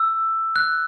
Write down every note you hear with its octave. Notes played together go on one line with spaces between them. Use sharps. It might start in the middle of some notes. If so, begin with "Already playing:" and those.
Already playing: E6
F#6